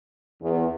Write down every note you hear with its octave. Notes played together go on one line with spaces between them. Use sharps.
E2